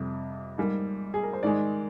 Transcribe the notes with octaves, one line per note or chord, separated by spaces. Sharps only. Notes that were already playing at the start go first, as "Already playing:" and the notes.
Already playing: F2 C3 G3
G#2 G3 A#3
G#4
A#4
C5
G#2 D#3 G#3 D5